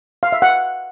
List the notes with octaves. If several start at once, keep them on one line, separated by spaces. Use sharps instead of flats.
F5
E5
F#5